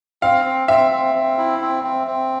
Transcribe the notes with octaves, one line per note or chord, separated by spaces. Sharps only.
C4 F5
C4
C4 E5
C4
C4
E4
C4
C4
C4